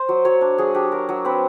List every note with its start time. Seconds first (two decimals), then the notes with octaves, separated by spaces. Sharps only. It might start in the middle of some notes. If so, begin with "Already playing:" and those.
Already playing: C5
0.09 F#3
0.25 F#3 C#5
0.41 D4
0.58 F#3 G#4
0.74 D4 G4
0.92 F#3 A#4
1.09 F#3
1.25 C4 B4